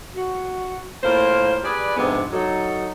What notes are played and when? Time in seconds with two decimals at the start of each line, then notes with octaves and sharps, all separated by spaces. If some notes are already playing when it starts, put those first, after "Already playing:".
0.15 F#4
1.04 A2 A#3 F4 A#4 C5 F5
1.63 G4 G#4 B4 D5
1.97 F2 G#2 C3 G#3 B3 D4
2.32 F#3 D#4 A4